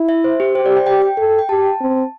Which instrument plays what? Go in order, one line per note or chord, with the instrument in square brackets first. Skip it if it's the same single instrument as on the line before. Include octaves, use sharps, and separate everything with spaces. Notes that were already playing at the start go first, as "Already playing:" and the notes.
Already playing: [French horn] E4
[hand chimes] E5
C5
G4
[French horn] G4 [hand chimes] C5
[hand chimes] D5
G5
[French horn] G4 [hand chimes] G5
[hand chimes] G5
[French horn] A4
[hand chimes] G5
[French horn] G4 [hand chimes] A5
[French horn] C4